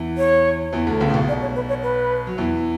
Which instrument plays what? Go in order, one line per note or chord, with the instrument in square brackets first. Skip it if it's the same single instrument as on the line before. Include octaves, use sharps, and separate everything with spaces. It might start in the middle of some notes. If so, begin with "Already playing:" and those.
Already playing: [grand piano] E2 E3
[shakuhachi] C#5
[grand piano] E2 E3
D2 D3
C#2 C#3
A2
B1 B2
[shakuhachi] D5
C#5
B4
C#5
B4
[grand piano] F#3
E2 E3